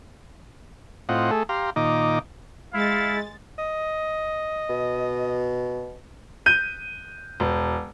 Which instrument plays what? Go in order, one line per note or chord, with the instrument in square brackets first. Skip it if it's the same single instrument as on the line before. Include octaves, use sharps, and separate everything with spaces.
[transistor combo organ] A2 C4 F4 D#5 F#5
A3 G#4 A4
G4 F5 A#5 C6
A#2 D#3 D#4 D#5 D6
[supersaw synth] G#3 A6 [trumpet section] E4 F5
[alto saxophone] D#5
[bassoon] B2
[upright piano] G6 D#7
E1